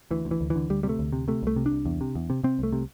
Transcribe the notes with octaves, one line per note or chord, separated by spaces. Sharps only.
D2 E3
D2
E3
D2
E3
D3
D2 G3
C3 G3
A3
D2
C3
C3 A3
C2 A3
C3
D4
C2
E2
C3
E2
C3
C3 C4
C2 A3
C3